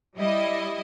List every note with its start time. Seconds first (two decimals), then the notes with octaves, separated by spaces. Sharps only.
0.16 G3 E4 D#5